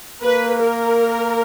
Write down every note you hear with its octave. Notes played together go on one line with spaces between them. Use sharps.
A#3 B4
A#4